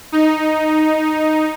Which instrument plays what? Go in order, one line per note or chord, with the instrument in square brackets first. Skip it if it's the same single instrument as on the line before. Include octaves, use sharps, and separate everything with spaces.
[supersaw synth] D#4